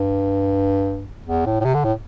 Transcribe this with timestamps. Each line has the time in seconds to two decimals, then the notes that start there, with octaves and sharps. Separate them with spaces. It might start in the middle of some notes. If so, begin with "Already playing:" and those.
Already playing: G2
1.27 E2
1.46 A2
1.60 A2
1.65 C3
1.74 D3
1.84 A2